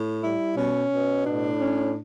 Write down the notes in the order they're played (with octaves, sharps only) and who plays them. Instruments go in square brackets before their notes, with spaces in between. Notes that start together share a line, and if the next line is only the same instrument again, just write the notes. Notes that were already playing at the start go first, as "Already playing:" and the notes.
Already playing: [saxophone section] A2
G3 E4
B2 C#4
B2
A2 D4
C#4